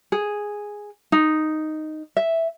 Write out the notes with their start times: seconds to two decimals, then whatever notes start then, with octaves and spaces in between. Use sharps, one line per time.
0.12 G#4
1.12 D#4
2.17 E5